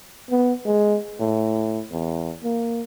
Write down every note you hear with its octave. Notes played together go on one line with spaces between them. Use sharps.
B3
G#3
A2
E2
A#3